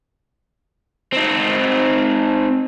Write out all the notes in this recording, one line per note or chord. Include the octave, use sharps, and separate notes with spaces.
C4 D#4